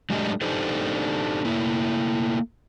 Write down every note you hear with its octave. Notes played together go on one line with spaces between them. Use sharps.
F#3 G#3 A3 D4 G4 D#5
D4 D#4 G4 A4 C5
A3 A#3 E4